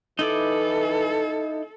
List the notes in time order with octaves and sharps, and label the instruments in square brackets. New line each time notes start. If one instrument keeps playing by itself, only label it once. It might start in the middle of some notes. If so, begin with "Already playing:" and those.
[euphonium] E3 [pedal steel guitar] D#4 E4 D6 [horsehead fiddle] A4